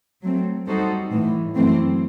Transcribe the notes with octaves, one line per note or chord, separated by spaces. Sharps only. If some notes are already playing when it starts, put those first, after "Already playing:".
F#3 A3 C4
G3 D#4 F#4 A4 C5
A2 E3 A3
F#2 E3 A3 C4